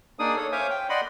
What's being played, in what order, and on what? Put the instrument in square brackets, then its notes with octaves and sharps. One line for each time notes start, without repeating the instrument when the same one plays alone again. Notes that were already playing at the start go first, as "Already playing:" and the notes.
[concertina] A#3 D4 D#4 G#4 D5 D#6
A4 C#5
C5 C#5 E5 F5 G#5 D6
G5
D5 D#5 F#5 B5 C6